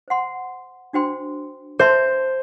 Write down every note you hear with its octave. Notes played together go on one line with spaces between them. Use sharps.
C5 F#5 C6
D4 F#4 C5 G5 C6
B4 C5 E5 A5 C6